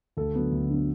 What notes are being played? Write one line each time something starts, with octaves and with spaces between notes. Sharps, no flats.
D2 A4
D3 F#3 B3
D2
D3 F#3 B3